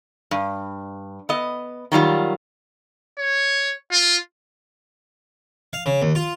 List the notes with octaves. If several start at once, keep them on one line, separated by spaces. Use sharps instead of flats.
G2
B3 D#5
D#3 F#3 G3 F4
C#5
F4
F5
C#3
D#2
F4